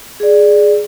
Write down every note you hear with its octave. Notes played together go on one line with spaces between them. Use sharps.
G#4 D5